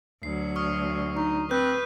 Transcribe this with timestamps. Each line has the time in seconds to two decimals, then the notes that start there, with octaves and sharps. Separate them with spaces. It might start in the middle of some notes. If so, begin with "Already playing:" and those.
0.23 D2 F#3 C7
0.56 C#6 D#6 F6
1.17 D#4 C#6
1.51 C4 B4 F#6 G6